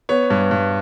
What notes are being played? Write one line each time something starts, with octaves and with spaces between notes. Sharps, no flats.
B3 C#5
G2
G2